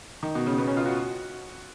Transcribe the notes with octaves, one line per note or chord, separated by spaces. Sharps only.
D#3
B2
C#3
B3
C#4
F4
F#4